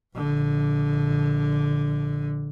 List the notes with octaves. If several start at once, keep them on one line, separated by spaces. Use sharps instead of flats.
A#1 D3